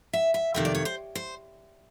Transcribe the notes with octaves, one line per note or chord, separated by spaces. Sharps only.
E5
E5
F2 C3 D#3 E5
D5
C#5
C5
C5